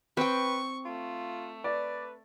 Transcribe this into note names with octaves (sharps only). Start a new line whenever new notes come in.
C4 B4 G5 C#6
A3 F4
B4 D5